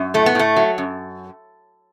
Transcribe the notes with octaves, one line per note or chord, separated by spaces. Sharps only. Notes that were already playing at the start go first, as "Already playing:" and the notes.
Already playing: F#2
A2 A3
B3
A2 A3
F#3
F#2